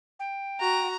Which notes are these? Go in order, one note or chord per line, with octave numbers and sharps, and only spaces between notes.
G5
F#4 A#5